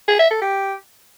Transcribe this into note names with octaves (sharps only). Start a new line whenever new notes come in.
G#4
E5
A4
G4